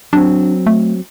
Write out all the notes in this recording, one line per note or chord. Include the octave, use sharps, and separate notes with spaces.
F#3 C4 D4
A3